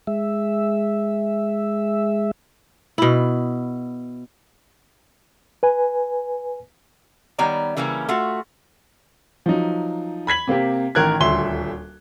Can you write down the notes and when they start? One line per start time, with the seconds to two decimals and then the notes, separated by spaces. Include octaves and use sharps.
0.07 G#3 E5
2.98 B2 E4
5.63 B4 G#5
7.38 D#3 G3 B3 C#5 D5 A#5
7.77 C#3 E3 G3 A#3 C#4
8.09 A3 F4 F#4
9.46 F3 F#3 D#4
10.27 B5 G#6 B6 F#7
10.47 C3 A#3 C4 G4
10.95 A1 D#3 A#4 F#6 G#6
11.20 D#1 D2 E5 C6 G7